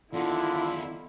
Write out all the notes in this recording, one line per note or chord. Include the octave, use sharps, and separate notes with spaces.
E2 D3 D#3 E4 F4